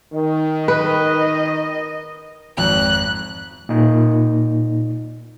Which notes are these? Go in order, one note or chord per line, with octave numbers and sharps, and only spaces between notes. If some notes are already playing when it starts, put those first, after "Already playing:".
D#3
B4 D#5
G#1 F2 F#6
A#2 D#4